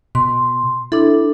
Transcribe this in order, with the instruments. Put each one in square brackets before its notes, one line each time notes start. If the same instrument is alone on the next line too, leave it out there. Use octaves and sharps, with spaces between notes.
[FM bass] B2 [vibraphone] C6
[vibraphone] D4 A4 [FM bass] E4